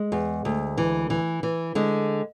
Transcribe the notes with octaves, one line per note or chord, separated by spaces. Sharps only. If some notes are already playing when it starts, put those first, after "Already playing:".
Already playing: G#3
E2
D2
E3
E3
E3
D3 G#3